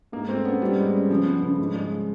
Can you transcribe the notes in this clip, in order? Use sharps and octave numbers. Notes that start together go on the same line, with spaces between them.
G#2 A#3
A3 C4
B3 C#4
G#2 G3
G#3
C#4
C#3 F3
B3
C#3
G#2
G#3